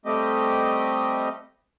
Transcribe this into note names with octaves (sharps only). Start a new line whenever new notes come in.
G3 A3 C4 G4 D#5